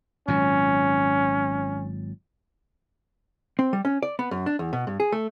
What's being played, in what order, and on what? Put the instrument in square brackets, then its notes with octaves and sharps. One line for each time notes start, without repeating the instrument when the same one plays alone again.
[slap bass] G#1 A#2 F#3 [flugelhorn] C#4
[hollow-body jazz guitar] C4
G3
C#4
D5
B3
F#2
D4
E2
B2
G2
G#4
A3